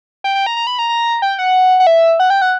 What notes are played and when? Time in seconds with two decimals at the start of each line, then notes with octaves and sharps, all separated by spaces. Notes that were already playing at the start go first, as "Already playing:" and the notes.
0.24 G5
0.35 G5
0.46 A#5
0.57 A#5
0.67 B5
0.79 A#5
0.89 A#5
1.22 G5
1.39 F#5
1.80 F#5
1.87 E5
2.20 F#5
2.30 G5
2.42 F#5